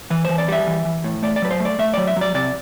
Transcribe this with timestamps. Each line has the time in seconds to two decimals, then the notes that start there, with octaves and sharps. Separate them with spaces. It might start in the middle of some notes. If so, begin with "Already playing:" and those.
0.10 E3 B4
0.25 E3 C5
0.38 D5
0.48 G3 E5
0.67 E3
0.85 E3
1.04 A2
1.23 A3 D5
1.36 D5
1.42 F#3 B4
1.51 C5
1.60 A3
1.65 D5
1.79 A3 E5
1.93 F#3 D5
2.08 E5
2.16 F#3 D5
2.34 C3 D5